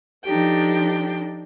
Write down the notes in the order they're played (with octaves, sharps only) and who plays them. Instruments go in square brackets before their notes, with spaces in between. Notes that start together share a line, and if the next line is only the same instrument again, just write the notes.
[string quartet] F3 D4 D#4 G4 A4 G5